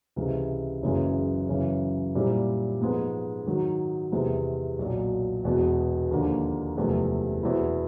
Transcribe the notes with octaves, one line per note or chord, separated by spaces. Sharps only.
C#2 C3 E3
F#1 F#2 C#3 E3 G#3
F#2 C#3 E3
A#2 G3 C4 E4
G#2 F3 G#3 B3
G#2 D#3 F#3
E2 C3 E3 G#3
B1 A#2 F#3
E1 E2 B2
D#2 D3 F3 A#3
F#1 E2 C3 F3 A3
E2 B2 G#3 C4 E4